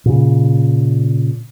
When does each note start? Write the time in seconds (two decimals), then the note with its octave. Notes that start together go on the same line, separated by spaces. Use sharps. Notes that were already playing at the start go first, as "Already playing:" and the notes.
0.05 A#2 C#3